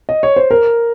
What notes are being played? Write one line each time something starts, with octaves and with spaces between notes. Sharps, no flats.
D#5
C#5
C5
A#4